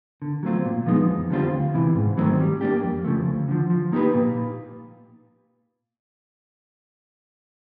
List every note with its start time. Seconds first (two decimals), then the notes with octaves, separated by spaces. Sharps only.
0.22 D3
0.43 F#3 A3 C4 F4
0.65 A#2
0.86 F3 G#3 B3 D#4
1.08 F2
1.30 D3 G3 C4 F4
1.52 D2
1.74 C3 E3
1.95 G#2
2.17 D#3 F#3 A3 C4
2.40 G3
2.61 A#3 D4 G4
2.83 F2
3.05 C#3 F3 A3
3.27 D2
3.48 D3 F3
3.70 F3
3.92 A#3 D#4 G4 B4
4.14 A#2